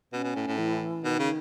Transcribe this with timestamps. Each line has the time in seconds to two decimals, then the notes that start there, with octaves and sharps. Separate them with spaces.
0.13 B2 C#4
0.24 B2
0.36 A2
0.47 A2
0.58 E3
1.04 B2 D#3
1.19 C#3